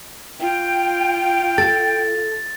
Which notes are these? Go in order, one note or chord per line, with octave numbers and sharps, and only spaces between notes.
F4 G5
A4 A6